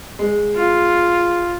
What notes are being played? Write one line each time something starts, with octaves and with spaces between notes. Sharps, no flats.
G#3
F4